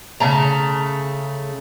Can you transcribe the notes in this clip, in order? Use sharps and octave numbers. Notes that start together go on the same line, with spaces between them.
C#3 A3 A5 A#5